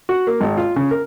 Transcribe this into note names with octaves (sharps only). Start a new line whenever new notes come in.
F#4
A#3
G#1
F4
C#3
A#4